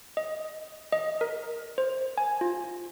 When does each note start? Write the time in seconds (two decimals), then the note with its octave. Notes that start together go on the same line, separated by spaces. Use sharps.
0.17 D#5
0.92 D#5
1.21 A#4
1.78 C5
2.18 G#5
2.41 F4